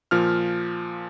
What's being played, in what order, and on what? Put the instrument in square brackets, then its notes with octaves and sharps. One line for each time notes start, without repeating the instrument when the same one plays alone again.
[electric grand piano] A#2 F3 F6